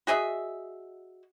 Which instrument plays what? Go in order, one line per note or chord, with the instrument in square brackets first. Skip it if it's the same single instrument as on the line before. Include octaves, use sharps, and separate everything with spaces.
[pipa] F#4 G#4 D#5 E5